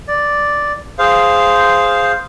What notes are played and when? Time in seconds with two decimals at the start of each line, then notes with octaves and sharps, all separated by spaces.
0.08 D5
0.99 G#4 C5 F5